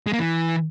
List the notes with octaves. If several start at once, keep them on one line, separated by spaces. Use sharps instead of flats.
G#3
A#3
E3